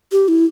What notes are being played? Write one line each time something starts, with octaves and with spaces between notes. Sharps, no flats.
G4
E4